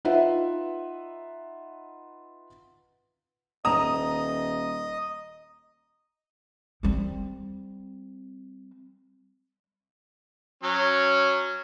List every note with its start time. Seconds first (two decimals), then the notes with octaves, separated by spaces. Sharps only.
0.05 D#4 F4 B4 E5 F#5
3.65 D#1 D#5 A#5 D#6
6.83 G3 C4
10.63 F#3 C#4